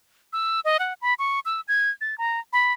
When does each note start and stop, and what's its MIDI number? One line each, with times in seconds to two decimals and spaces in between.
0.33 0.60 88
0.65 0.77 75
0.79 0.94 78
1.02 1.14 83
1.19 1.40 85
1.45 1.61 88
1.68 1.90 92
2.01 2.17 93
2.18 2.40 82
2.53 2.73 83